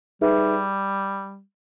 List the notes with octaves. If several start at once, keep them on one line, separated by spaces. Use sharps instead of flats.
G3 D#4 G#4 B4 E5